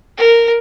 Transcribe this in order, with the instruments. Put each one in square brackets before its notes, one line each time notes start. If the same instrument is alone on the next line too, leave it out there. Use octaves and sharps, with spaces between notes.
[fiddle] A#4